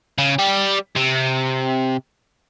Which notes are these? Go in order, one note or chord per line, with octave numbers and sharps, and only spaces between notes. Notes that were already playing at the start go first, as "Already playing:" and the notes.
C#3
G3 G4
C3